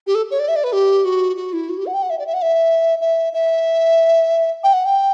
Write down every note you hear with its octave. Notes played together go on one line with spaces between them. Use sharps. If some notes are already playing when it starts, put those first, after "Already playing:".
G4
A4
C#5
D5
E5
D5
B4
G4
F#4
F#4
E4
F#4
G4
F#5
G5
F#5
E5
D5
E5
F#5
E5
E5
E5
G5
F#5
G5